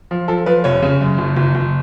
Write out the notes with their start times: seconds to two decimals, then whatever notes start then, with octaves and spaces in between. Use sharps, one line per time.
0.11 F3
0.28 F3 A4
0.46 F3 B4
0.64 F1 C#5
0.82 C#3
1.01 F#2
1.18 F#1
1.37 F#1
1.55 F#1